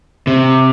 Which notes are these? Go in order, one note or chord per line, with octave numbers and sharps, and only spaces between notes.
C3